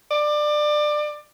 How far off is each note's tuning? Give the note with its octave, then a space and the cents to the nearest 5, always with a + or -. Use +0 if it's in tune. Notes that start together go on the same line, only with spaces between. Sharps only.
D5 +25